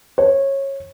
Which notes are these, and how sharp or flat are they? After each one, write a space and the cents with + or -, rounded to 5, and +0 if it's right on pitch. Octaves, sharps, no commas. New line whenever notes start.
C#5 -20